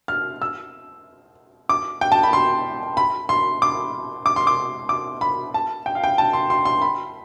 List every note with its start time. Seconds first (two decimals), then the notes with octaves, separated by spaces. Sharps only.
0.08 F6
0.42 E6
1.69 D6
2.01 G5
2.12 A5
2.23 B5
2.33 C6
2.97 B5
3.29 C6
3.62 D6
4.26 D6
4.36 C6
4.47 D6
4.89 D6
5.21 B5
5.54 A5
5.86 G5
5.95 F5
6.04 G5
6.18 A5
6.33 C6
6.50 C6
6.65 C6
6.81 B5